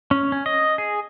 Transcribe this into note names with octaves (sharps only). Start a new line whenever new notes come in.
C#4
C#4
D#5
G#4